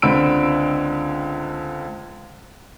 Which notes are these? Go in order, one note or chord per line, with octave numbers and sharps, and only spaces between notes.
C#2 D3 C4 B5 E6 D7